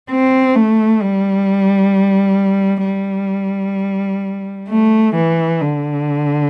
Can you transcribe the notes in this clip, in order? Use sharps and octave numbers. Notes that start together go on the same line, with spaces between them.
C4
A3
G3
G3
A3
E3
D3